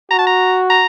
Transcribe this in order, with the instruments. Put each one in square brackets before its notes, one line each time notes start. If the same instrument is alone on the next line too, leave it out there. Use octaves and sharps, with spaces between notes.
[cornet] F#4 [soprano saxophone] A#5
[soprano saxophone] A5
A#5
A#5